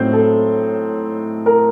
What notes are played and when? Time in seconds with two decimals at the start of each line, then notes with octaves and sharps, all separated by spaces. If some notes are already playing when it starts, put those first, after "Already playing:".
Already playing: A2 F#3 C4 D#4 C5
0.13 A4
1.46 A#4